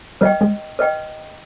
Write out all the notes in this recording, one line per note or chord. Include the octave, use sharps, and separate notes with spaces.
G3 B4 D#5 G5
G#3
B4 D#5 G5